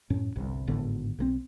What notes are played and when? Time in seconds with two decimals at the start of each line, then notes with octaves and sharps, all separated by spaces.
0.10 F#2 A2 C#4
0.36 G1 C2
0.68 G#1 A2 D3 B3
1.19 B1 D#3 C4